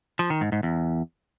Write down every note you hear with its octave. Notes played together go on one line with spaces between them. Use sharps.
F3
D#3
G#2
G#2
E2